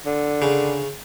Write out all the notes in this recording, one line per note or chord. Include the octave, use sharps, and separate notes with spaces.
D3
C#3